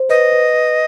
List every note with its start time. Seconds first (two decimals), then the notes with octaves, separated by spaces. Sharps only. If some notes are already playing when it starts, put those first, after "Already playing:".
Already playing: C5
0.09 B4 D#5
0.32 B4
0.54 B4